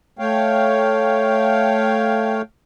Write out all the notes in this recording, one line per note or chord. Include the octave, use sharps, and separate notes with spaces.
A3 C#5 F5 G5